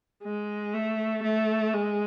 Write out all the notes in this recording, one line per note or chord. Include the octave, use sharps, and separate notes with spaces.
G#3
A3
A3
G#3